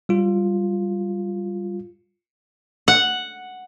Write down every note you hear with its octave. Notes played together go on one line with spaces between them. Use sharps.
G3 F4
F#5